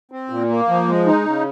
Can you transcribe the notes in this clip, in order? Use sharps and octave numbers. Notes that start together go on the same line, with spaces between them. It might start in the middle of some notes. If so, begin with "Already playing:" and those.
C4
A#2
A#3
F3
G#3
D#4
C#3